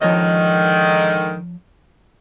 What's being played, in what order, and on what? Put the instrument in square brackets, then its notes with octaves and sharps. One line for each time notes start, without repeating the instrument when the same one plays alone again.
[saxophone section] G#2 D3 D#3 [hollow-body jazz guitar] F3 C#5 D#5